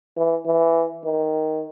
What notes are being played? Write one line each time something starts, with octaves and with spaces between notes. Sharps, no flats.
E3
E3
D#3